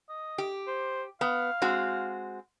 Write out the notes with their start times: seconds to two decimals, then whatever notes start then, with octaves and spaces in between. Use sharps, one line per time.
0.09 D#5
0.38 G4
0.67 C5
1.21 B3 F5
1.62 G#3 C4 F#4